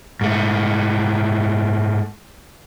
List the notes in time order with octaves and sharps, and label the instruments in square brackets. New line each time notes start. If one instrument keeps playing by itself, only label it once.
[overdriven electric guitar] G#2 A3